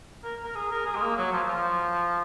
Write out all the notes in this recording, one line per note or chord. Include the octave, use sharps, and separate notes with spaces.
A#4
A#4
G#4
A#4
G#4
G#3
A#3
F#3
F3
F3